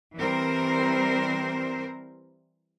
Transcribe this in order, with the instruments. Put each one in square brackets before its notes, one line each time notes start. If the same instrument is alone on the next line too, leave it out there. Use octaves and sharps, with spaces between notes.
[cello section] E3 G3 C4 A#4 C5